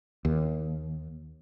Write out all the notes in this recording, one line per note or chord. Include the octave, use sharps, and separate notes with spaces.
D#2